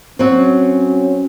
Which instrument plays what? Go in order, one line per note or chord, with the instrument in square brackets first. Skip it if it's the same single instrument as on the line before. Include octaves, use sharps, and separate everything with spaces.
[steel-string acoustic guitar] F#3 C4 [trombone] C#4